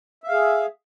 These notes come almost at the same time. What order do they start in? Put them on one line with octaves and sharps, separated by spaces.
E5 F5 G#4